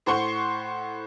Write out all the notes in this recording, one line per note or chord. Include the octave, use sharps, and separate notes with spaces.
A2 C5 F#5 C6 C#6